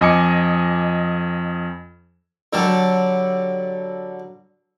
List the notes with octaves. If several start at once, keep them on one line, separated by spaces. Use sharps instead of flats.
F2 D#5 G#5 D6 C#7
D3 F#3 G3 A4